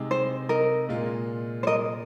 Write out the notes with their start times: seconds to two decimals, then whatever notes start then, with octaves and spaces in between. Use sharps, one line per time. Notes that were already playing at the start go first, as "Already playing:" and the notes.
Already playing: C3 G#3 D#4 G#4
0.11 C5
0.49 A#4 D#5
0.89 A#2 G#3 F4
1.63 C5
1.67 A#4 D#5